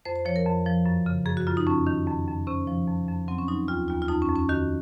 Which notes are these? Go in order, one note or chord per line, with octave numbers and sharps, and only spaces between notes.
F2 C5
C5
F3 C#5
A#4
F2
F3
F#2
C#3
F#2 G#4
F#4
F#2 F4
D#4
F2 C#4
D#3
F2
F2
C3 C#4
F3
F2
F2
F#3 C4
C#4
F#3 D#4
D#2 F4
D#2 F4
F4
F2 D#4
C#4
F2
C#4
D#3 F#4